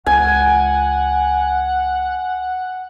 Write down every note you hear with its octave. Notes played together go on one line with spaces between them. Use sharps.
C#2 F4 F#5 G#5